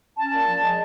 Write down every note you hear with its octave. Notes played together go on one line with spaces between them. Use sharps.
C#4 A5
A#2
F3
G#3